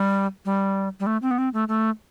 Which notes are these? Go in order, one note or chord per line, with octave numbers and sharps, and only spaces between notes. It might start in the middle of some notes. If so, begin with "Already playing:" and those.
Already playing: G3
G3
G3
A3
C4
B3
C4
A3
A3